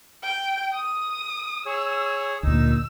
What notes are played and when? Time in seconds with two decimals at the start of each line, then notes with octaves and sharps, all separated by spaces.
0.23 G5
0.73 D#6
1.66 G#4 C#5 E6
2.43 D2 A#2 D#4 E6